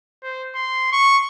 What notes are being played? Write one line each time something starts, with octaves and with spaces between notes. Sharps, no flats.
C5
C6
C#6